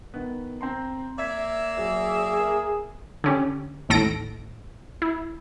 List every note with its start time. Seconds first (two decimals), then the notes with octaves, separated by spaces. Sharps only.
0.14 D#3 B3
0.61 C4 A#5 C6
1.18 A#3 D5 E5 G#6 B6
1.78 F#3 G#4
2.40 A#4
3.24 D3 C#4 G4
3.89 A1 D#2 A2 A4 A#6 D7
5.02 E4